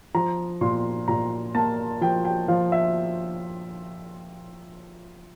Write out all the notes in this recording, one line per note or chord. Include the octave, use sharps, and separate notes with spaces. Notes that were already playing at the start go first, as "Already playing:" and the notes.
F3 A#5
A#2 C6
A#2 A#5
A#3 A5
F3 G5
G5
F3 F5
E5